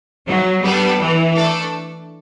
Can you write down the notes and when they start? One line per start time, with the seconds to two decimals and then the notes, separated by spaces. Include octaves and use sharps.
0.26 F#3
0.63 G3 B3 D4 A4
0.99 E3
1.36 A3 D4 A4